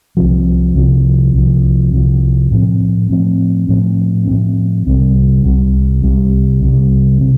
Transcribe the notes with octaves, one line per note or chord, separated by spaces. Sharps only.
C2 C3 F3
C2 C3 F3
C2 C3 F3
C2 C3 F3
A2 F3 C4
A2 F3 C4
A2 F3 C4
A2 F3 C4
C2 C3 G3
C2 C3 G3
C2 C3 G3
C2 C3 G3
C3 G3